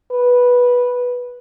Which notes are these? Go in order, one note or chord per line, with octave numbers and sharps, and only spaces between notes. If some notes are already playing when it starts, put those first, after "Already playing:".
B4